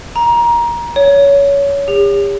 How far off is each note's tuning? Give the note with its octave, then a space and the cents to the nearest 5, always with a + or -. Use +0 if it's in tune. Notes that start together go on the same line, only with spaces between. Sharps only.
A#5 +20
C#5 +20
G4 +40